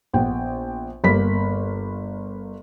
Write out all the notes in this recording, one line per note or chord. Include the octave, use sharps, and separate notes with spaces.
A#1 B3 G5
G1 A#3 B5 B6